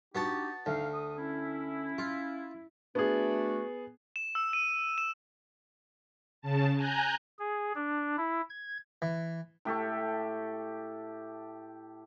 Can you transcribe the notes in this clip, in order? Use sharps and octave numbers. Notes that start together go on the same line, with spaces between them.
B3 D4 D#4 F#4 G4 A5
D2 D#4 F5
A4 D#6
C#4 E4
F4
A3 B3 D4 F#4 G#4
E7
E6
D#7
E7
C#3 A5
G#5 A#5 F#6 G6
G#4
D4
E4
G#6
E3
A2 G4 A4 C#6